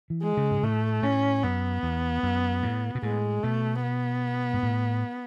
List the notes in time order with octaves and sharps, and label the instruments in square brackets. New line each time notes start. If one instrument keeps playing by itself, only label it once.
[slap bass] E3
[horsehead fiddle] G#3
[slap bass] C#3
G#2
[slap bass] A2 [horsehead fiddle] A3
[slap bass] A2 [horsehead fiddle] C#4
[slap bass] F#2 [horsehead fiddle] B3
[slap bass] E2
F#2
A2
B2
[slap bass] A2 [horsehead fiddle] G#3
[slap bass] B2 [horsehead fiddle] A3
[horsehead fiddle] B3
[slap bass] G#2
A2